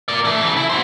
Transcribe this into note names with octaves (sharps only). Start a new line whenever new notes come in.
A#4 D5
E3 A3
C#3 E3
E4
F#4 C5